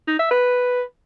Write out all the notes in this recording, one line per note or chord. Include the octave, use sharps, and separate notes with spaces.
D#4
E5
B4